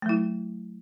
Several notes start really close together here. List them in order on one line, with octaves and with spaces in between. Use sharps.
A3 F#3 E4